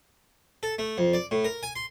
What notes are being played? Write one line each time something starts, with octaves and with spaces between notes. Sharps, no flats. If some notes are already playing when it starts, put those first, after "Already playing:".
A4
A3
F2
D5
A2
A#4
G#5
C6